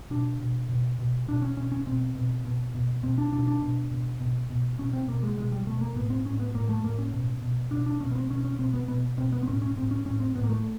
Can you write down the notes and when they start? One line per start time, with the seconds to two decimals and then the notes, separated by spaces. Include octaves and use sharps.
0.10 B2 D4
0.40 B2
0.69 B2
0.99 B2
1.27 B2 D4
1.42 C#4
1.57 B2 C#4
1.72 C#4
1.87 B2 C4
2.15 B2
2.45 B2
2.74 B2
3.03 B2 C4
3.18 D4
3.33 B2 D4
3.48 D4
3.62 B2
3.91 B2
4.20 B2
4.50 B2
4.78 B2 C#4
4.93 C4
5.08 B2 A#3
5.23 G#3
5.38 B2 G#3
5.52 G3
5.67 B2 A3
5.81 A#3
5.96 A2 B3
6.10 C4
6.25 A2 C#4
6.40 B3
6.54 A2 A#3
6.69 A3
6.83 A2 A#3
6.99 C#4
7.13 B2
7.42 B2
7.71 B2 D4
7.86 D4
8.01 B2 C#4
8.11 B3
8.15 C4
8.30 B2 C#4
8.45 C#4
8.59 B2 C4
8.74 B3
8.88 B2 B3
9.17 B2 C4
9.32 B3
9.43 C4
9.47 A2 C#4
9.62 C#4
9.76 A2 C4
9.91 C#4
10.05 A2 C#4
10.20 C4
10.35 A2 B3
10.43 A#3
10.50 A3